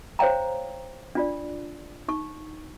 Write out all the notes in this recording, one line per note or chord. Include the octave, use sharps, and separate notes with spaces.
C5 C#5 F5 G5 A#5
D4 F4 D5
D#4 C#6